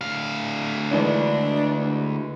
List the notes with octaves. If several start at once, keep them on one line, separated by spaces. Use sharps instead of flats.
D2 F5
D#3 E3 G#3 D4